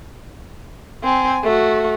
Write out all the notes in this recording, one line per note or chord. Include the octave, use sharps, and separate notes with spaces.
C4 G#5
A3 F#4